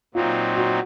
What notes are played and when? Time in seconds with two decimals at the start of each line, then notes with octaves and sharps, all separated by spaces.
0.14 A#2 F#3 C4 D#4 F4
0.55 F#4